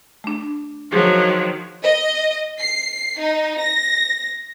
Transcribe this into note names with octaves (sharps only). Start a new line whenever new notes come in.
A3 D4
D#3 F3 F#3 G#4
D#5
C7
D#4
A#6